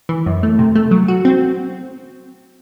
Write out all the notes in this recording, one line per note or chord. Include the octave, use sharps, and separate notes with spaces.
E3
F#2
A3
C3
A3
F#3
F#4
C4